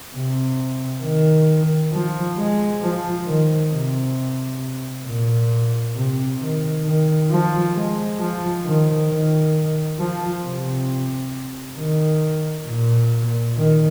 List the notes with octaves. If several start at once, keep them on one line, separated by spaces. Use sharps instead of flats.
C3
D#3
F3
G#3
F3
D#3
C3
A#2
C3
D#3
D#3
F3
G#3
F3
D#3
D#3
F3
C3
D#3
A#2
D#3